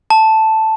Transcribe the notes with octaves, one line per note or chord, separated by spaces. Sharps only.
A5